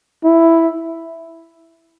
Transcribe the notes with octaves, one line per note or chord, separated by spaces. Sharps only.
E4